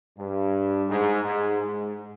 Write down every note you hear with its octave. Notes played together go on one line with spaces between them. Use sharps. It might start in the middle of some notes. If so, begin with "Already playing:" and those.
G2
G#2
G#2
G#2